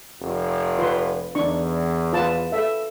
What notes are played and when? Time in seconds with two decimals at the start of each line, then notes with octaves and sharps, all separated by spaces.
0.21 F1
0.78 F4 B4 C6
1.35 E2 D4 D#4 C#6
2.13 F4 B4 A5
2.52 A4 E5